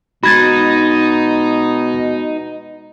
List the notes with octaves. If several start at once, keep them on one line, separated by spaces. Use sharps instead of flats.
B2 G#3 D#4 F#4 B5 G#6 A6